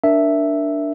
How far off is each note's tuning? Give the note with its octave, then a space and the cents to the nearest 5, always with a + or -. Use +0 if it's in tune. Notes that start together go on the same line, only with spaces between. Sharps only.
D4 +0 A#4 +0 E5 +0